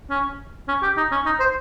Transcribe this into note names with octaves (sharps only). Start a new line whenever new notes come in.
C#4
C#4
G4
D#4
C#4
D#4
C5